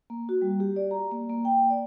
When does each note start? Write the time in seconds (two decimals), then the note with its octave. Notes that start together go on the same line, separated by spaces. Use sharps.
0.10 A#3
0.29 F#4
0.42 G3
0.60 G4
0.76 D5
0.91 A#5
1.11 A#3
1.29 A#3
1.45 G5
1.70 D5